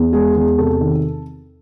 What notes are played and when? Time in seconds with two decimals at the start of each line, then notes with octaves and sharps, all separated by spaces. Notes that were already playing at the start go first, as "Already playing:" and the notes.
Already playing: E2
0.12 G#3 G#4
0.35 E2
0.58 C3 A4
0.81 D#3